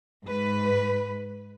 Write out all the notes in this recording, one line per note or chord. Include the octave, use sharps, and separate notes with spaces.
G#2 B4